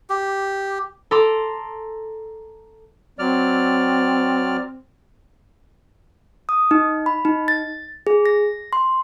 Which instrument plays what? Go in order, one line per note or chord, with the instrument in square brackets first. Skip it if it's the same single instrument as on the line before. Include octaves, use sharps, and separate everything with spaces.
[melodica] G4
[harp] A4 A#5 C6 D6
[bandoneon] F#3 D5 F6 [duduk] C4
[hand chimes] D#6
D#4
B5
D#4
A6
G#4
A#6
C6